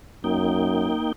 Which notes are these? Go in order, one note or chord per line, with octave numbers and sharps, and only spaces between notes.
F#2 A#3 D#4 G5